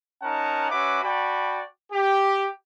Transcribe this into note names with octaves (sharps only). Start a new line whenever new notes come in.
C#4 D#4 A#4 F#5 A5
C#4 F#4 B4 E5 D6
F#4 D5 G5 A5 B5
G4